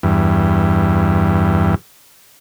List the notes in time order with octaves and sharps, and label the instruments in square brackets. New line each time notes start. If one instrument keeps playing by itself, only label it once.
[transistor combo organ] E2 G2